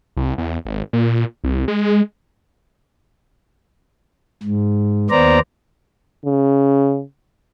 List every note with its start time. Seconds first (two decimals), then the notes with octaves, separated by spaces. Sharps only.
0.17 C2
0.38 E2
0.66 G#1
0.93 A#2
1.44 C2
1.68 G#3
4.43 G#2
5.10 D#2 B3 C5 D5 A#5
6.25 C#3